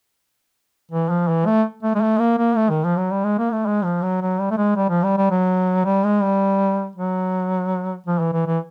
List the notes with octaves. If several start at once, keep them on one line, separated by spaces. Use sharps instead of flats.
E3
F3
E3
A3
A3
G#3
A3
A#3
A#3
A3
D#3
F3
F#3
G3
G#3
A#3
A3
G#3
F3
F#3
F#3
G3
A3
G#3
G3
F3
G3
G3
F#3
G3
G#3
G3
F#3
F3
E3
E3
E3